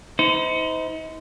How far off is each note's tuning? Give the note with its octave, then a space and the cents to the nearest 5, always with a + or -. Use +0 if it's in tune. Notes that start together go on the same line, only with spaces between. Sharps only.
D#4 +40 C5 -30